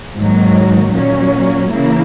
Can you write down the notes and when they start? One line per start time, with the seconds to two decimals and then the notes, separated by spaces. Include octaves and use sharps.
0.17 G#2 D#3 F#3 A#3
0.94 A#2 F#3 C#4
1.72 C#3 E3 A#3 E4